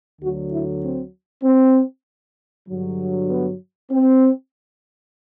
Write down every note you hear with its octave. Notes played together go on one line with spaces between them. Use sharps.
D2 D3 F#3 F#4
E4
C4
C4
G2 D3 F#3
B3
C4